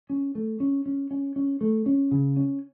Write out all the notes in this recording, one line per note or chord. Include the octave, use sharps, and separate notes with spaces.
C#4
A3
C#4
C#4
C#4
C#4
A3
C#4
C#3
C#4